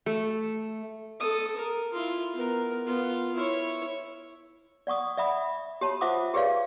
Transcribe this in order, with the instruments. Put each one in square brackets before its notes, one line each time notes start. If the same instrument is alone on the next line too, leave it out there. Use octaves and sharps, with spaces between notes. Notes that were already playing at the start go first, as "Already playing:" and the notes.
[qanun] A3
[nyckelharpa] A4 D#6
A#4
E4 F4
B3 A#4
B3 F4
E4 C#5
[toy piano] D5 F#5 C#6 D#6
D5 E5 F#5 B5 D#6
G4 C#5 A5 B5
F4 C5 E5 F#5 D6 D#6
G4 G#4 B4 C#5 D5 F5